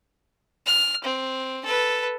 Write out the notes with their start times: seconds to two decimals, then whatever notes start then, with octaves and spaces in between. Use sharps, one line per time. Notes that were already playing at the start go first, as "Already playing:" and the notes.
0.66 F6
1.04 C4
1.65 A4 B4